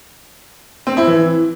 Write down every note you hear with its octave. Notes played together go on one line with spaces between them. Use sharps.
C4
E4
E3